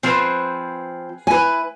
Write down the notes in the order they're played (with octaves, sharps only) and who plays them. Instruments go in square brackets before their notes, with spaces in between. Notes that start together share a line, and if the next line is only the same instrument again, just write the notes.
[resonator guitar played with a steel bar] F3 C4 [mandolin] G#4 B4
[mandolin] E4 B4 [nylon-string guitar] G#5